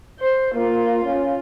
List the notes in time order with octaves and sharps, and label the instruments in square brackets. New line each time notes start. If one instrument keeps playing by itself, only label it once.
[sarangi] C5
[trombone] A#3 [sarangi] F4
[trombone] C#4